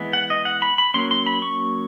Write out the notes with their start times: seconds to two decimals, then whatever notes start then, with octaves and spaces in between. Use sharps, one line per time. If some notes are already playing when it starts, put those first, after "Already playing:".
Already playing: E3 G#3 B3
0.13 F#5
0.30 D#5
0.45 F#5
0.62 B5
0.78 B5
0.94 F#3 A#3 C#4 C6
1.11 C6
1.26 B5
1.42 C#6